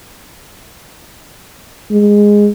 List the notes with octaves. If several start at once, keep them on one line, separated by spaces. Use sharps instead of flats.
G#3